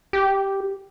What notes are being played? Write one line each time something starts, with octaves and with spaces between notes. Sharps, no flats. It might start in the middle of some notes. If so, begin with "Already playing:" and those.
G4